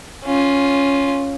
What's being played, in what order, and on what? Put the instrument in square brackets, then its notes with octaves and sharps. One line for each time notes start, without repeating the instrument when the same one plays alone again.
[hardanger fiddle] C#4 F4